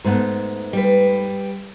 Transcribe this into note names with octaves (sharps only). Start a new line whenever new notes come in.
G#2 A3 B3
G3 B4